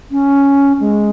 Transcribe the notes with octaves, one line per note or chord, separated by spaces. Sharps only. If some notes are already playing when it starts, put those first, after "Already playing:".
C#4
G#3